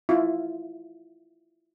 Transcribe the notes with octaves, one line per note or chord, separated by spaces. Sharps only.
E4 F4